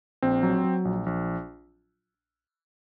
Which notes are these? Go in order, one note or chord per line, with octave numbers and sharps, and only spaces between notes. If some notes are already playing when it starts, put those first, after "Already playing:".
A#1 C4
F#3
F#3
A#1
A#1